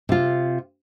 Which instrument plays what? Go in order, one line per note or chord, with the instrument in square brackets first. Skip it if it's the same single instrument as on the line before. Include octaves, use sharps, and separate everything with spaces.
[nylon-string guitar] C3 F4